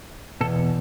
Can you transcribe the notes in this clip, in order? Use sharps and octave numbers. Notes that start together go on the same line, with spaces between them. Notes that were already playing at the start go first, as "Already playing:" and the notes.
E2 B2 A4